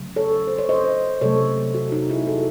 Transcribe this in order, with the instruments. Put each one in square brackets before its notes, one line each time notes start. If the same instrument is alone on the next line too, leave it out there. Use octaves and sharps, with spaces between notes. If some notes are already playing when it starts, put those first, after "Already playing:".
Already playing: [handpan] C#3 F#3 A3
A4 C#5
C5
C#5
C5 D#5
C3 F#3 A3 A4 C#5
F#4 A4
D#4 F#4
E4 G#4
F#4 A4